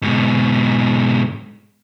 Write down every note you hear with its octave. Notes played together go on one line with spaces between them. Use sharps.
G#2 B2